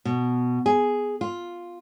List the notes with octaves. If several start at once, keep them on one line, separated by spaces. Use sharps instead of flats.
B2
G#4
F4